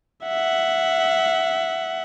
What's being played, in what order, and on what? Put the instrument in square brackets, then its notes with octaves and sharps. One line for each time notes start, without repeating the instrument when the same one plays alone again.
[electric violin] E5 F#5